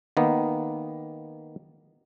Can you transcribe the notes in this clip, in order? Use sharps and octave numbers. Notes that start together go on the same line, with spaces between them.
D#3 A#3 B3